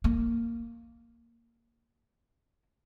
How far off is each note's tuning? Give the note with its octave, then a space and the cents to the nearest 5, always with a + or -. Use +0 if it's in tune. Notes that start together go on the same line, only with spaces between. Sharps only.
A#3 -5